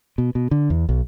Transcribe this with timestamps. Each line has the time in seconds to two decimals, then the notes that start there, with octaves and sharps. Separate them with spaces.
0.18 B2
0.35 B2
0.51 D3
0.70 E2
0.89 B1